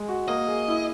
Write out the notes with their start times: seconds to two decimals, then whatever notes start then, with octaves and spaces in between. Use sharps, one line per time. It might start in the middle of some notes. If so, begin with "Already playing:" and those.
Already playing: G#3
0.08 F#4
0.28 A#3 D#5
0.47 G#4
0.68 E4